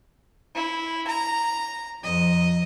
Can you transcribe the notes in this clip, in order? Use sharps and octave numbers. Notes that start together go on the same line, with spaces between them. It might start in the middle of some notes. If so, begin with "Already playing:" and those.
E4
A#5
F2 D#5